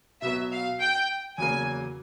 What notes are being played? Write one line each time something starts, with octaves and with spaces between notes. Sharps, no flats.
B2 F#3 B3 E5
F5
G5
E2 C#3 F#3 A#3 G#5